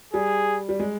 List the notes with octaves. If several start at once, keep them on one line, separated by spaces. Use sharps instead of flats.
G3 G#4
G3
G#3